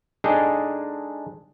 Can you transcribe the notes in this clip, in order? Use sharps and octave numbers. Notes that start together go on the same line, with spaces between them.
G#3 D4 D#4 G#4 A4 G5